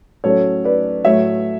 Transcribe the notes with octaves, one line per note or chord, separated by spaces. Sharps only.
A2 F#3 C#4 A4 C#5
B4 D5
A2 F#3 A3 C#5 E5